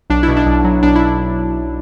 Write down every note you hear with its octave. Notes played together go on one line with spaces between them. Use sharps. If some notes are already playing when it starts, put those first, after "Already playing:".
B1 D4
E4
B2
D4
B1
F#3
B1 D4
E4